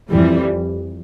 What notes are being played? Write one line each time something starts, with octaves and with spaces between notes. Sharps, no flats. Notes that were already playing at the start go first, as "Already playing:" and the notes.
F2 E3 G3